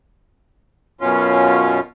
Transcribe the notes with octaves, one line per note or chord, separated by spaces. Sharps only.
F#2 B2 C#4 F4